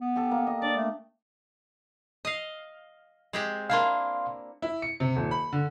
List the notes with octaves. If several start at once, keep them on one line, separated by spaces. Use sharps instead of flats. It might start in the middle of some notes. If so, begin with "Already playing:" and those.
B3
G4 A4
A#3
D#5
D4 D5
A3
D#5 F5
G#3 C4 G4
A#3 D4 E4 F5 C6
E4
C#7
C3
D#1
B5
D3